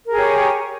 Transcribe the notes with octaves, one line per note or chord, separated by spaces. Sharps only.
G4 G#4 A#4 C#5